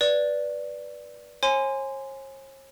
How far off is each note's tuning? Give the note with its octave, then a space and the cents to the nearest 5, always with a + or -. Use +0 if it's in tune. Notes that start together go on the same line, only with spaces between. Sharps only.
B4 -10 D5 +0
C#5 -45 G#5 +0 C6 -20